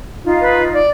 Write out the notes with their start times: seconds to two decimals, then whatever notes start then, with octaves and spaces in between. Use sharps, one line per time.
0.24 D#4 F4
0.41 B4
0.73 D5